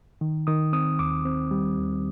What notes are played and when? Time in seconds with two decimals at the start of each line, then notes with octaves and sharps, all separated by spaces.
0.21 D#3
0.47 D#3 D#6
0.73 C4 D#6
0.99 D#2 D6
1.25 C4
1.51 G3
1.77 D#2